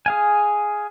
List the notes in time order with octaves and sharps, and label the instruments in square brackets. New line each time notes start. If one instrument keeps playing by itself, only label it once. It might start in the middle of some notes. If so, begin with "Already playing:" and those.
[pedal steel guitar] G#4 F5 G#5